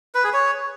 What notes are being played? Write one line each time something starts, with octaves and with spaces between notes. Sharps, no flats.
B4
G#4
C#5